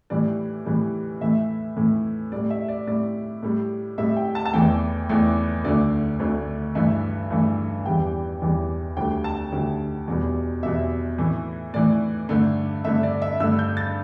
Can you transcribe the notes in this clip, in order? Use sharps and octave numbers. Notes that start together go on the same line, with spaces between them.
A2 E3 G3 D5
A2 E3 G3
A2 E3 A3 E5
A2 E3 A3
A2 G3 D5
E5
D5
A2 G3 D5
A2 G3
A2 G3 E5
G5
A5
A5
E2 E3 A3 G5
E2 E3 A3
D2 D3 A3 D5
D2 D3 A3
G2 E3 A3 E5
G2 E3 A3
E2 E3 G3 G5
E2 E3 G3
D2 D3 G3 G5
A5
D2 D3 G3
E2 B2 G3
E2 B2 G3 E5
A2 E3 A3
A2 E3 A3 D5
G2 D3 A3
G2 D3 A3 E5
D5
E5
G2 D3 A3 E6
G6
A6